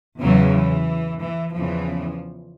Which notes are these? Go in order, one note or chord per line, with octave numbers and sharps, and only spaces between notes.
E2 C#3 E3 F#3
E3
E3
E2 C#3 E3 F3